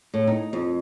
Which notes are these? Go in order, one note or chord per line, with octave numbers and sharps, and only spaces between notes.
A2
D#4
F2